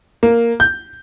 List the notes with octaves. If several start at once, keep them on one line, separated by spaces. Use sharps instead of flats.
A#3
G6